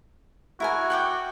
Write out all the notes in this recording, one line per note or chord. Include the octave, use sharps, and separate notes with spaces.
E4 F#4 A#4 G#5
F#5 G5 D6